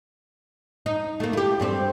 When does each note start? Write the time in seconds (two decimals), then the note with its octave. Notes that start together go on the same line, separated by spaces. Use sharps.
0.86 D#4
1.20 A3 A#3
1.33 E4 G4
1.60 G2 G3 C4